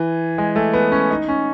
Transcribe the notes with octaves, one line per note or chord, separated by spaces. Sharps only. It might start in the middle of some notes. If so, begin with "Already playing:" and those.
Already playing: E3
G#3
A3
B3
C#4
D#4
C#4